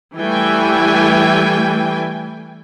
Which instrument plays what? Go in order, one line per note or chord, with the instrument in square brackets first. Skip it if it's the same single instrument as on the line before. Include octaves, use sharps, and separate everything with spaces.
[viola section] E3 G3 A3 G5 G#5